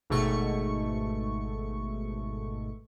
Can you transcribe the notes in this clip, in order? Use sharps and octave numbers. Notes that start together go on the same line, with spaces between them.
G#1 G#2 B2 A3 C#6